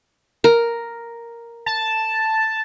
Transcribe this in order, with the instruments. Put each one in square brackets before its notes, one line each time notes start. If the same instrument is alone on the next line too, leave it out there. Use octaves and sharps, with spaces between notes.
[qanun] A#4
[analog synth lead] A5